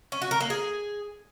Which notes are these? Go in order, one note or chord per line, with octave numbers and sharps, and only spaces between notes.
C#4
F#4
A#4
A#3
G#4